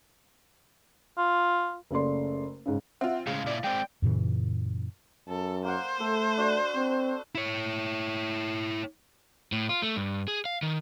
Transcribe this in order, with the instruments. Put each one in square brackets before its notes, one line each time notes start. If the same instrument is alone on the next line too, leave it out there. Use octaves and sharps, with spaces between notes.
[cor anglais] F4
[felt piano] F#1 C#3 A3 D5 C6
G#2 C#3
[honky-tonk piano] C4 F4 [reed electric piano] E5 F#5
[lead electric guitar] A2 G#3 [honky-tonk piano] C#3 [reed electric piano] F5
[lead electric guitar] A#2 E4 [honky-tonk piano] D5
[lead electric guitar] G#3 C4 [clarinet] G5
[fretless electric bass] F#2 A#2 C#3 E3
[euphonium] F#2 [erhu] A4
[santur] A#3 A#4 F#5 [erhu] C5
[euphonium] A3 [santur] A4
[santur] D4 F#4
[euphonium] C4
[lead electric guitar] E4 C#5
[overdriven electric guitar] A2
F4
A3
G2
G#4
F5
D#3